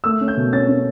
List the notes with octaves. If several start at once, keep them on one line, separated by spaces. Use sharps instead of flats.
A3 E6
C#4
G6
B2
C#4 A6
C#4